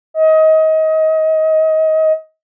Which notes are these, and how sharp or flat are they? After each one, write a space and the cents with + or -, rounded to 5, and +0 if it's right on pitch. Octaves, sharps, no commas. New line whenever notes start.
D#5 +25